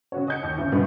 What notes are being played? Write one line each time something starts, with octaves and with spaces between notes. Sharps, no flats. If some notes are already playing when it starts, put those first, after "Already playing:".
C#3 F#4 C#5
D#5 G6 C#7
D#2
D2 C#3
C2 G2 B2 D3